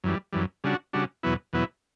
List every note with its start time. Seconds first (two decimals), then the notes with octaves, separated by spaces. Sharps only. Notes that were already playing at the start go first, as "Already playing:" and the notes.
0.04 F#2 E3 G3
0.33 F#2 E3 G3
0.64 C#3 G3 D4 F#4
0.93 C#3 G3 D4 F#4
1.23 E2 B2 F#3 B3 E4
1.53 E2 B2 F#3 B3 E4